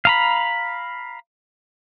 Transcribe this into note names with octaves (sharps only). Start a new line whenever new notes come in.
F5 A#5 B5